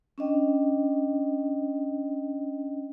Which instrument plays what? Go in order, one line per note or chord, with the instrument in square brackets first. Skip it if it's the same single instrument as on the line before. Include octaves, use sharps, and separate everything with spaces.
[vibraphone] C#4 D4 D#5 G5